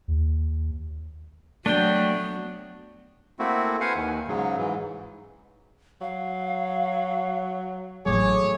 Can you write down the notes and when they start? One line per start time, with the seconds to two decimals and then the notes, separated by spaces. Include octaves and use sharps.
0.08 D#2
1.66 F#3 A3 B3 D4 G5
3.39 A3 A#3 C4 E4 F#4
3.81 B4 C5 F5 F#5 G#5
3.96 D#2 D#3
4.28 G#2 C#3 F#3
4.57 G#2 E3
6.01 F#3 F5
8.06 A1 A2 F#3 A3 G#4 C#5 D6